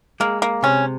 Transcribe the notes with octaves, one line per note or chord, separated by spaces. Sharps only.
G#3 A#3
A#3
C3 C#4